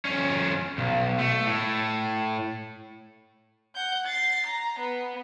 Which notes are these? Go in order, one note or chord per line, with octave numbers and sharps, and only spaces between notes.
F2 C#4
B1
A3
A2
F#5 G6
A6 C7
A#5
B3